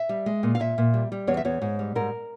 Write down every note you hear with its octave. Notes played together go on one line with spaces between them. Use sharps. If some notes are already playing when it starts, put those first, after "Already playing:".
Already playing: E5
G3
G#3
A#2
F5
A#2 E5
A#2
G3
G3
E2 C#5
E5
E2 C#5
G#2
G3
G#2 A#4